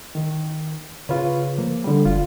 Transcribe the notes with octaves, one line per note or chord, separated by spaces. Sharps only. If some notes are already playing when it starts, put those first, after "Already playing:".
D#3
C#3 F4 B4 C#5
F3 A#3
D3 G3
F#1 F4